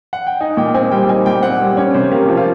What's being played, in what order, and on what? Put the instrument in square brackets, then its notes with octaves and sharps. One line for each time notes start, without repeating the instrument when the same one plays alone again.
[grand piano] F#5
G5
[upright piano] D#4 [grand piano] G#5
[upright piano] A#2 [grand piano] G5
[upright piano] C4 [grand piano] G#5
[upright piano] G3 [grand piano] G5
[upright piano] D#4 [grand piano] G#5
[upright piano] A#2 [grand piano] G5
[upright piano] C4 [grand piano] F#5
[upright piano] G3
[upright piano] C#4 [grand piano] C#5
[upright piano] C3 [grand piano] C5
[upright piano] A#3 [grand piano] G4
[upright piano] F3
[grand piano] F4